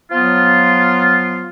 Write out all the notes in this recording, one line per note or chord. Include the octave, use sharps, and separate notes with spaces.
F3 F#3 B3 F4